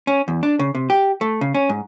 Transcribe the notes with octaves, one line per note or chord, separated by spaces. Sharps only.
C#4
E2
D4
C#3
C3
G4
A3
C#3
C#4
G#2